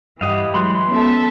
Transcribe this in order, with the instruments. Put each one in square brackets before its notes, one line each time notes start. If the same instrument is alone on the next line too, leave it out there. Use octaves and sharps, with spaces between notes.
[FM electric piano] G2 F#5 [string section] E3 [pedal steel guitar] G4 D#5 F5
[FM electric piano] F#3 G#3 [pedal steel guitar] B5 C6 F#6
[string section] B3 A4 E5 [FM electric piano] C#4 B6